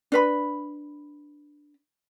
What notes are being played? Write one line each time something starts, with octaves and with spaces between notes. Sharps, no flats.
D4 B4 B5